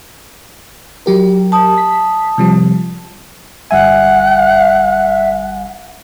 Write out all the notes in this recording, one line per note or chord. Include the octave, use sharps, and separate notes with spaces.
F#3 G4 A#4
A5 D#6
B6
C3 F3 G3
G1 G3 E5 F#5 G#5